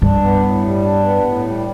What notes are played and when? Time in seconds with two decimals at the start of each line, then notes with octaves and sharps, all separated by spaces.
0.02 G2 D4
0.23 B3
0.43 A2
0.63 G3
0.84 D4
1.04 B3
1.24 A2
1.45 G3